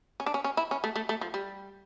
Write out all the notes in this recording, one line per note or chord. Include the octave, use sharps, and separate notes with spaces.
C#4
D4
C#4
C#4
E4
C#4
A3
A3
A3
F3
G3